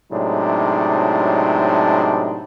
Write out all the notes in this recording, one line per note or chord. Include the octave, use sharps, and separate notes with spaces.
A2 C3 F#3 G#3 D4 D#4